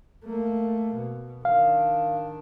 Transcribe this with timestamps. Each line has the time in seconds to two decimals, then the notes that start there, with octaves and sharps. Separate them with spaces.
0.24 A3 A#3
0.95 B2
1.45 D#3 D4 F5